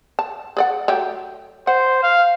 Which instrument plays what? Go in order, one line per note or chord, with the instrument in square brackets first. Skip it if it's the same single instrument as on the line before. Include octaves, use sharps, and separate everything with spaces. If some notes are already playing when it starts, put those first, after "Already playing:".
[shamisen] A5
G#4 D5 F#5
F#3 A3 G4
[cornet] C5 [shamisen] F#5
[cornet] F5